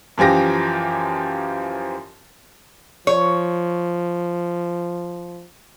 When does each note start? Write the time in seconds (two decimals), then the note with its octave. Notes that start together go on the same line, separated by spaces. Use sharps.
0.18 F#2 E3 F3 G4 A#6
3.07 F3 C#5